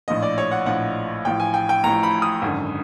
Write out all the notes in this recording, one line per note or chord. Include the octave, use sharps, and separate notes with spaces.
A#1 A2 F3 D#5
D5
C#5
F#5
A#1 A2 F3 F#5
A1 A2 F3 G5
G#5
G5
G5
A1 A2 F3 A#5
B5
D#6
G#1 F#2 D3